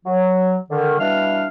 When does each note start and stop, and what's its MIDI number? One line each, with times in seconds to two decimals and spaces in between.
0.05 0.56 54
0.70 0.96 50
0.70 0.96 51
0.99 1.47 47
0.99 1.47 52
0.99 1.47 55
0.99 1.47 62
0.99 1.47 77
0.99 1.47 89